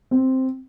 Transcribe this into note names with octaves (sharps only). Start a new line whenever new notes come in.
C4